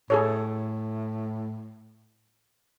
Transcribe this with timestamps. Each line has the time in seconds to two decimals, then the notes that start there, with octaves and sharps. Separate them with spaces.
0.10 A2 G#4 A4 C#5